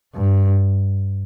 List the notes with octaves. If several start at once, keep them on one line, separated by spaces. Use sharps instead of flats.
G2